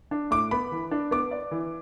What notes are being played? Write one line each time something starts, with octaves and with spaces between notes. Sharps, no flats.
D4
A2 D6
B3 B5
E3
D4
B3 D6
D5
E3